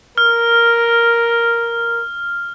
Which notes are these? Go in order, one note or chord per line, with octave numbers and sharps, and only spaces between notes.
A#4 F6